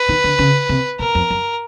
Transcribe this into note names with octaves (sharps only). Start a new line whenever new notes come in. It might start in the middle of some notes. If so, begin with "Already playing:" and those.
Already playing: B4
D#3
D3
C#3
C3
B2 A#4
F2
F#2